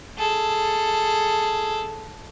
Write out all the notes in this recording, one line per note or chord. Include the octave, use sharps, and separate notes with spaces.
G#4 A4